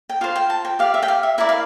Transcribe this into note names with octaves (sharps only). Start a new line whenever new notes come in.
G5
F4 C5 F5
G5
A5
G5
G4 D5 F5
E5
G5
F5
E5
E4 A#4 D5 E5
F5